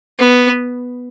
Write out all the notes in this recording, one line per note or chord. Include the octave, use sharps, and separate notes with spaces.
B3